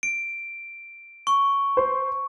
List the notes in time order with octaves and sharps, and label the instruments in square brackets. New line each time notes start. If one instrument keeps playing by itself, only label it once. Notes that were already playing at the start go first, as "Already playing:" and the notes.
[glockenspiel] D7
C#6
[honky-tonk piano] C5